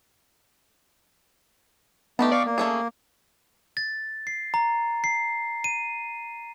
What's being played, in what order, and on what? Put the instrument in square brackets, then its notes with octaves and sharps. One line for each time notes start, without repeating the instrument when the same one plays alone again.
[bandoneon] A3 [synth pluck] B3 [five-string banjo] D4 D#4 G4
[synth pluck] D5 [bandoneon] F5 C#6 D6
[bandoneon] A#3
[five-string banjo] A3 C#4 G#4
[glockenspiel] A6
C7
A#5
C7
D#7